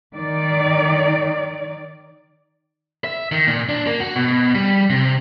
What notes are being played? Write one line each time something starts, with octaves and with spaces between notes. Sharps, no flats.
D#3 D5
E5
D#3
A#2
D4
A#3
F#4
B2
G3
C3